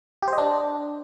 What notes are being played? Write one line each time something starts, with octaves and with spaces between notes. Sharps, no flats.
G4
C5
D#5
D4